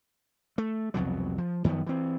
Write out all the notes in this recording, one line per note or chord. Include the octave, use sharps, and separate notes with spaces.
A3
C2 F2 B2 F#3
F3
F#2 D#3 F3 B3
E3 C4